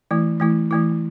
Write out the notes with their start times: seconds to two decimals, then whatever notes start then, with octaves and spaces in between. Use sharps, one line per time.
0.11 E3 A3 E4
0.40 E3 A3 E4
0.71 E3 A3 E4